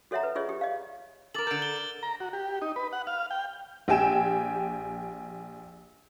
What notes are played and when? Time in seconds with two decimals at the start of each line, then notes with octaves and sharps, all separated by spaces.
0.11 F#4 A4 C#5 E5 F#5 A#5
0.23 B4
0.35 F4 G#4 C#5 D#5
0.49 G4
0.61 D#5 F5
1.34 A4 A#4 D6 A6 F#7
1.47 D3 A#4 G6 D7
1.62 G7
1.76 G7
2.03 A#5
2.20 F#4
2.33 G4
2.62 D#4
2.76 B4
2.93 F#5
3.07 F5
3.31 G5
3.88 A#1 G4 G5 G#5 E7